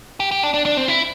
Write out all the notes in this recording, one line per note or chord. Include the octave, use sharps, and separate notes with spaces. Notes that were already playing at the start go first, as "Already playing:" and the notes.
G4
G4
D4
D4
D4
C4
E4